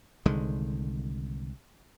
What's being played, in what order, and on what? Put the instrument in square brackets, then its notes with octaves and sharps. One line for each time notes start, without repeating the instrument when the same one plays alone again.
[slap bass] C2 D3 D#3 G#3